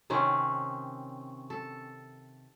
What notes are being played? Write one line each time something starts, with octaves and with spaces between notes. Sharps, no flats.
C3 D#3 C4 C#4
A4